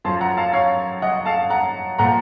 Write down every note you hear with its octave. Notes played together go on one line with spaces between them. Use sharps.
F#2 F3 A5 C6
F#5 A#5
F5 A5
C#5 F5
D#5 F#5
F5 A5
F#5 A#5
A#2 F3 F#5 A#5